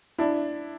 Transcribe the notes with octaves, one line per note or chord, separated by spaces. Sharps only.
D4 E4